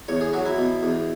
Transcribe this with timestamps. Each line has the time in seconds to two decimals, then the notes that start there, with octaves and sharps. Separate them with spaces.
0.08 E2 C#5
0.21 G#4
0.33 F#3 F#4
0.46 E4
0.58 B2
0.83 E2